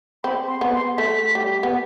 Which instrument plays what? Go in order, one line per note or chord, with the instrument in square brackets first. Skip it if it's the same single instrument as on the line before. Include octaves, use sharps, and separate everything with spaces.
[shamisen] C4 [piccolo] B5
[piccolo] C6
[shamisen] B3
[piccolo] C6
[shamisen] A3 [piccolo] B6
[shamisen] G3
B3